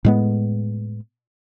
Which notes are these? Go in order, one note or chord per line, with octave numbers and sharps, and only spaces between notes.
A2 G#3 B3